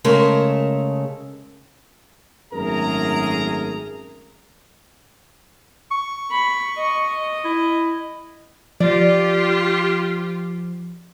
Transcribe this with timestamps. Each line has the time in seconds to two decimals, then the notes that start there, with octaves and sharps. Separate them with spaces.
0.04 C#3 G#3 A3 A#4 A5
2.53 G#1 F#2 A3 G#4 A#4 A#5
5.91 C#6
6.31 B5
6.77 D#5
7.45 E4
8.80 F3 F4 G4 D5